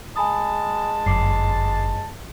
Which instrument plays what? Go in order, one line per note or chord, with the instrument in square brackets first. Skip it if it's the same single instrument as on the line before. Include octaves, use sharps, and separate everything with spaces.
[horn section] G#3 A5 [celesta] G#5 B5 D#6
[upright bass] G1 [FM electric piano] F#2 [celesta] D6 C7